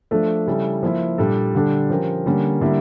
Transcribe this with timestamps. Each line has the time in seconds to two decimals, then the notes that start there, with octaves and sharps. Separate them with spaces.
0.11 F3 A3 D4 A4
0.47 C#3 G3 C#4 E4 A4
0.83 F3 A#3 E4
1.18 A#2 G3 D4 A4
1.55 D3 G3 D4 A4
1.90 F3 C#4 G4 A#4
2.26 D3 G3 A#3 C#4
2.61 D3 G3 A#3 E4